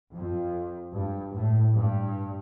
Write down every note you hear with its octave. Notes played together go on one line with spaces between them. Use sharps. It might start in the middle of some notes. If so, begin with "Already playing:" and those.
F2
G2
A2
G2